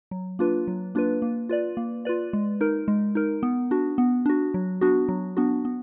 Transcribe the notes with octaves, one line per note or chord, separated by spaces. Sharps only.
F#3
A#3 D4 F4 B4
F#3
A#3 D4 F4 B4
A#3
F4 B4 D5
A#3
F4 B4 D5
G#3
D#4 A#4
G#3
D#4 A#4
B3
D4 F#4
B3
D4 F#4
F#3
B3 D4 F#4
F#3
B3 D4 F#4
B3